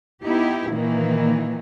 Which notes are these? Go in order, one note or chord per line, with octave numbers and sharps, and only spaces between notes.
B3 D#4 E4 G4
A#2 D#3 E3 A#3